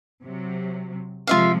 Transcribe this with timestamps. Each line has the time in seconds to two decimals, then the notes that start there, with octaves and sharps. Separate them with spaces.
0.23 C3 F#3
1.27 C3 F3 G#3 F4 E5 F5